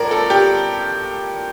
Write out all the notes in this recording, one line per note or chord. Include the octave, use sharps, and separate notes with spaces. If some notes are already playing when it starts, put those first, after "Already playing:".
Already playing: A2 F3 A#4 D5
A4
G4